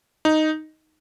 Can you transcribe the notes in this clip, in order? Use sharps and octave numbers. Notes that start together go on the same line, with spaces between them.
D#4